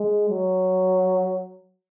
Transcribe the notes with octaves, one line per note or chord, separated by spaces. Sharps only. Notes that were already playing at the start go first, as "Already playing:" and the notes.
Already playing: G#3
F#3